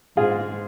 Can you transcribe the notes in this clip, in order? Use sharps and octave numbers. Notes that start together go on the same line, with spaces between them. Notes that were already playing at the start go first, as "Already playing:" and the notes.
G#2 F4 G#4